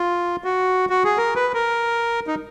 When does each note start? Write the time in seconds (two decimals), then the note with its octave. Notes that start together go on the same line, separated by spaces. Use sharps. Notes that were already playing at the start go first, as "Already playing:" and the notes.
Already playing: F4
0.44 F#4
0.89 F#4
1.04 G#4
1.18 A#4
1.36 B4
1.54 A#4
2.27 D#4